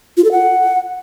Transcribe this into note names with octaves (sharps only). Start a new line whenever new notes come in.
F4
A4
F#5